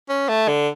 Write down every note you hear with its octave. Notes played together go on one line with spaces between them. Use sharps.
C#4
A3
D3